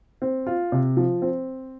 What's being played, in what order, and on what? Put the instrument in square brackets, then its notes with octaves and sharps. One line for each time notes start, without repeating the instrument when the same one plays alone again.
[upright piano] C4
F4
C3
F3
C4